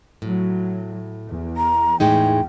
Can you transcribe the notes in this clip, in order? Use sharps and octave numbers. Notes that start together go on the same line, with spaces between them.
A2 F#3
E2
A#5
E2 A2 G#3 D#4 G5